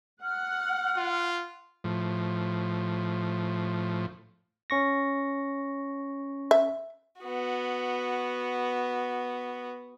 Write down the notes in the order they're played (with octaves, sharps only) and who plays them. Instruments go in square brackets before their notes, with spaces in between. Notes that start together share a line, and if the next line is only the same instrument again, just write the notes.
[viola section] F#5 [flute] F6
[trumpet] F4
[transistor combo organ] A2 F3
[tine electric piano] C#4 C#6 A#6
[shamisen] E5
[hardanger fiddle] B3 F#4